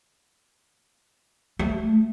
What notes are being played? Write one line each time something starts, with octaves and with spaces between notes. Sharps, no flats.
A3